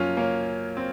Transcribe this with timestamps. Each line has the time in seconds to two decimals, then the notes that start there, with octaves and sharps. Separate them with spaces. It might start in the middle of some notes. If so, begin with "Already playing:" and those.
Already playing: F#2 F3 A#3 C#4 F4
0.17 A#3 C#4
0.77 C4